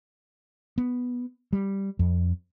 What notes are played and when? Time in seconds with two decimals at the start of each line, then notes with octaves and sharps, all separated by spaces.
0.78 B3
1.53 G3
1.99 F2